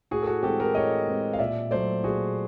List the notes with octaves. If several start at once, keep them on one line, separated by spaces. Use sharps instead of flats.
A2 F#4 G#4
A4
F#4 G#4
E3 G#3 C4 G4 A4
G#4 A#4
A2 C#5 D#5
E3 G#3 C4
F5
A#2 D5 E5
F#3 A3 C5 D5
A#2 F#4 G#4